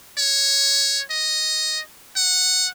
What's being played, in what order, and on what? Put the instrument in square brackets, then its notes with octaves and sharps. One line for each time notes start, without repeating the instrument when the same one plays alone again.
[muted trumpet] C#5
D#5
F#5